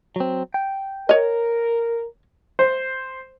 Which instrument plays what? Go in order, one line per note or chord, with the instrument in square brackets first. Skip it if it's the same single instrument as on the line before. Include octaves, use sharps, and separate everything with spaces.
[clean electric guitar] F#3 C4
G5
[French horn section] A#4 [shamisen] C#5 D#5
[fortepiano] C5